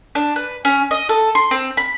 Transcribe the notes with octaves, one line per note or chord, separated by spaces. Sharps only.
D4
B4
C#4
D#5
A4
C6
C4
B5